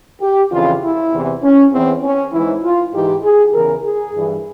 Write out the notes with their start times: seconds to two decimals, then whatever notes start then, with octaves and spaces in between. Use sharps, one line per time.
0.22 G4
0.52 F2 C#3 E3 F4
0.83 E4
1.13 E2 C3 E3
1.43 C#4
1.72 E2 E3 C4
2.03 C#4
2.33 G#2 E3 E4
2.63 F4
2.93 G#2 E3 G4
3.23 G#4
3.54 E2 C#3 E3 A#4
3.84 G#4
4.14 G2 E3